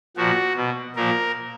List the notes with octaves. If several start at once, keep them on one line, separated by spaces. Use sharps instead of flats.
A#2 F3 F#4
B2
A#2 F3 A#4